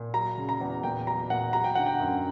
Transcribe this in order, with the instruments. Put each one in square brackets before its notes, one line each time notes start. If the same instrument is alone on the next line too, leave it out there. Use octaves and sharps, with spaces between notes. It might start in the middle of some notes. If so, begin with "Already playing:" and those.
Already playing: [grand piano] A#2
F#3 A#5
C#3
A#5
E2
A#2 G5
F#3 A#5
A#2 F#5
F#3 A#5
G5
D3 F#5
G5
F#2